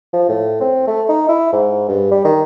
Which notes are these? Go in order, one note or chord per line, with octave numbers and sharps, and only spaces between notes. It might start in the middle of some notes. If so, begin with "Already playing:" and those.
F3
A2
C4
A3
D#4
E4
G#2
G2
G3
D#3